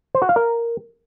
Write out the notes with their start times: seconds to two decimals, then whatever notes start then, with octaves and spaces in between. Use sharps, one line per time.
0.15 C5
0.22 F#4
0.29 F5
0.36 A#4